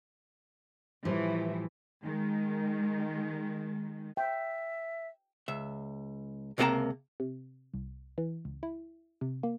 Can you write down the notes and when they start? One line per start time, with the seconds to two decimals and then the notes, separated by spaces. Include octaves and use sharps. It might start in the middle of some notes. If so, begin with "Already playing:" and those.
1.05 A2 E3 F3 G3
2.03 D#3 G#3
4.17 E5 G5
5.48 C#2 E5
6.58 C#2 C3 A#3 G4 A5 A#5
7.20 C3
7.74 C2
8.18 E3
8.45 C#2
8.63 E4
9.21 C3
9.43 A#3